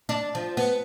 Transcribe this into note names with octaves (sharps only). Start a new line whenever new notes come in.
D4
F3
B3